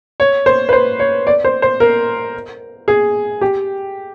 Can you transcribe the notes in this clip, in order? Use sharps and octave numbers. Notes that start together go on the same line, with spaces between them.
C#5
C5
B4
C5
C#5
D5
C5
C5
A#4
G#4
G4